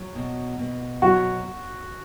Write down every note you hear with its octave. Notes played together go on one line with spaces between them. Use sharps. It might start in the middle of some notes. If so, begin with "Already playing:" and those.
Already playing: F#3
B2
B2
F#3 F#4